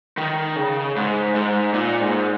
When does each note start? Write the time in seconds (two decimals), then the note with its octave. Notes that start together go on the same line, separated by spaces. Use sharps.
0.18 D#3
0.56 C#3
0.96 G#2
1.35 G#2
1.74 A#2
2.01 G#2